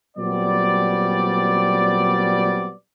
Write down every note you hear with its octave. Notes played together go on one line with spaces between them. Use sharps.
A#2 F#3 G3 B3 C4 D5